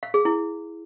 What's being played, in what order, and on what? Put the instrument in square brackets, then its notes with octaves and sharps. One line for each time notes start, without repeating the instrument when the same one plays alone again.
[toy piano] F5
G#4
E4